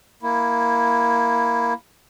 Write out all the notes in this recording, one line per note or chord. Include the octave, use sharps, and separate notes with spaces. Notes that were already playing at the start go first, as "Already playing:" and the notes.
A#3 E4